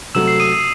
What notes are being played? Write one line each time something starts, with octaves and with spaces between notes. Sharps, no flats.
C3 F#3 A3 E6 E7
C7
D#6 D#7
C7